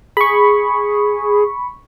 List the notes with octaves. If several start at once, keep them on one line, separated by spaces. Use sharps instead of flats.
G#4 B5 C#6